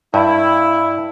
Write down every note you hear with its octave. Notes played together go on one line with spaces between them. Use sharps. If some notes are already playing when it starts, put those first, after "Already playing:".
G2 E4